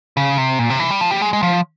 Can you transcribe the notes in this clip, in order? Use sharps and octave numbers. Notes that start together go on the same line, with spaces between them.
C#3
C3
A#2
C3
E3
G3
F3
G3
G#3
G#3
F3